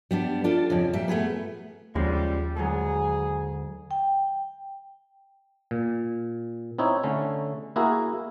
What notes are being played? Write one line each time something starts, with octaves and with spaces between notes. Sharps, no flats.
G3 B3 D4
D4 F4 A4 D5
F2 C#3 F3
A#2 G3 E5
A3 B3 G#4 B4
D#2 C#3 F3 G3 G#3
D2 G#2 F#3 G#4
G5
A#2
C4 D#4 E4 C#5
D3 A3 C#4
A#3 E4 F#4 G#4 A#4